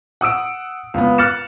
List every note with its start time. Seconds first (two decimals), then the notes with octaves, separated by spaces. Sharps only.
0.21 F#5 D#6 E6 D7
0.94 C#2 B3
1.18 F6 F#6 A6 C#7 E7